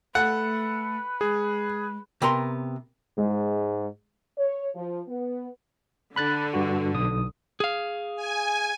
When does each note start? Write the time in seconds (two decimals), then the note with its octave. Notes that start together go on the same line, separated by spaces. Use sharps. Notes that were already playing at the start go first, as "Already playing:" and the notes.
0.15 A3 A4 B4 F#5
1.21 G#3 G#4
2.22 C3 B3 A#4 A#5 C6
3.18 G#2 G#3
4.37 C#5
4.75 F3
5.07 B3
6.16 D3 B5 F#6 A6
6.54 G2 F#4
6.94 B1 D#6
7.60 G#4 F5
8.16 G#5